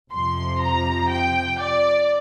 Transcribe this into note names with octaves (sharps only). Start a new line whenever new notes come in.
F2 C3 F3 C6
A#5
G5
D5